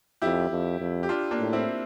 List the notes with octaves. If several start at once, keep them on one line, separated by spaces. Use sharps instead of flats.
F2 E4 G4
F2
F2
G4
D4 F4
A#3 D4
A2
C4 E4